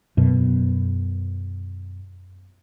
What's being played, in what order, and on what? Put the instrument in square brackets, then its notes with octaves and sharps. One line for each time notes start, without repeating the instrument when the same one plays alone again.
[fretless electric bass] F#2 B2